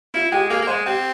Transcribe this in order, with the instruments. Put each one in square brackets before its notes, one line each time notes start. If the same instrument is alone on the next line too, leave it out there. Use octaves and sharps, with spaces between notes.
[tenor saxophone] E4 [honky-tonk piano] F4
[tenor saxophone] G#3 [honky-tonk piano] G4
[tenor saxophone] A#3 [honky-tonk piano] G#4
[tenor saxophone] A#3
[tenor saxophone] G#3 [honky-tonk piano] C5
[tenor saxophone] C4 [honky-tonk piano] G4